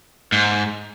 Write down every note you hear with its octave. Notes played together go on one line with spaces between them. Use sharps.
G#2